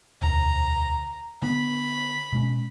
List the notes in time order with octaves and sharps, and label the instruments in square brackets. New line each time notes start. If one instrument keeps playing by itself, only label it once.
[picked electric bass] E1 D2 [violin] A#5
[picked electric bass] D3 B3 [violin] B5
[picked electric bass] B2 G#3 C#4